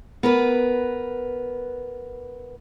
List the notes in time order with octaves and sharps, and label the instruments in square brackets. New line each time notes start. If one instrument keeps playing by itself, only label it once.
[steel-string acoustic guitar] B3 A#4 B4